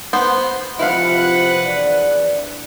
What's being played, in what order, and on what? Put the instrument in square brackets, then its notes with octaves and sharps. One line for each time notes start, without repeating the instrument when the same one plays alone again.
[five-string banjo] B3 C5
[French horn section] C3 F3 [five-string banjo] E4 F5 [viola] B4 F#5
[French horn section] E2 D4 D5